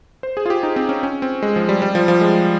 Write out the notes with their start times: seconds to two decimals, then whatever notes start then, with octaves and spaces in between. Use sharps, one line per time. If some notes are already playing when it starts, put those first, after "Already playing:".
0.23 C5
0.37 G#4
0.46 F4
0.50 G4
0.63 D#4
0.76 C4
0.89 C#4
1.03 C#4
1.22 C4
1.42 G#3
1.56 F3
1.69 G3
1.82 G3
1.95 F3
2.08 F3
2.21 G#3